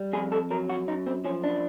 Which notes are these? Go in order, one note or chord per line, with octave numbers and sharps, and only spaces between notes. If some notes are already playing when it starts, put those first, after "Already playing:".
Already playing: G3
F2 G#4
A4
F#3 A#4
F#4
F#2 D#4
C4
F3 C#4
D4